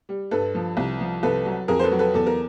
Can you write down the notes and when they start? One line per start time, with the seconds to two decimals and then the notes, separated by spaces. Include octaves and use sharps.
0.09 G3
0.31 G2 A4 B4
0.55 F3
0.77 C2
1.00 F3
1.23 C2 A4 B4
1.46 F#3
1.68 F2 G#4 A#4
1.79 C5
1.84 A4 B4
1.91 F#3
1.99 A4 B4
2.14 E2 A4
2.27 A#4